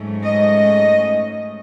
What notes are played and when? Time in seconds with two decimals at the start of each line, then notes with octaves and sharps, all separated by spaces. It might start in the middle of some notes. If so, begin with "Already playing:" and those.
Already playing: G#2 F#3 A3 C#4
0.25 D#5